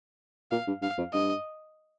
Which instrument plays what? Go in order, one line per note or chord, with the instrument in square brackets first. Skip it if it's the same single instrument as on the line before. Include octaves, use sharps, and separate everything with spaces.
[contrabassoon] A#2 [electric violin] F5
[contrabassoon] G2
[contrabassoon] G2 [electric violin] F5
[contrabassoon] F2
[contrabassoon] G2 [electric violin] D#5